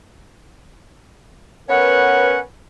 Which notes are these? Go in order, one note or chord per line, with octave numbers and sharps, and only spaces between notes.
B3 C#4 A#4 B4 C#5 F#5